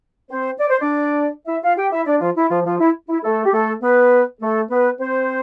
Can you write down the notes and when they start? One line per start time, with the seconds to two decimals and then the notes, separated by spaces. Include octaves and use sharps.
0.31 C4 C5
0.60 D5
0.71 C5
0.81 D4 D5
1.48 E4 E5
1.63 F4 F5
1.78 G4 G5
1.92 E4 E5
2.07 D4 D5
2.21 F3 F4
2.37 E4
2.51 F3 F4
2.66 F3 F4
2.80 E4
3.09 E4
3.24 A3 A4
3.45 G4
3.53 A3 A4
3.83 B3 B4
4.41 A3 A4
4.71 B3 B4
5.00 C4 C5